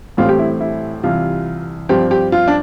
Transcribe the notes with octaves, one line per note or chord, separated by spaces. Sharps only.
A1 A2 G3 C4 F4
G4
E4
E4
C2 C3 E3 F4
G2 F3 C4 G4
G4
F4
D4